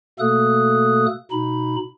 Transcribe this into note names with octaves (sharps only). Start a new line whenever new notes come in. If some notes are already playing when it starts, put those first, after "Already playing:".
B2 A3 A#3 A4 D#6 F#6
B2 D#4 B5